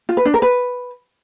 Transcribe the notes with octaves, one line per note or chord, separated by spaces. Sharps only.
F4
B4
D4
A#4
B4